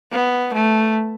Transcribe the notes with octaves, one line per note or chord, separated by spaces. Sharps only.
B3
A3